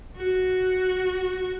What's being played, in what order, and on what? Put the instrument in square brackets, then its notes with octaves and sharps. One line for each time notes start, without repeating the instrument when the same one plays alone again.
[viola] F#4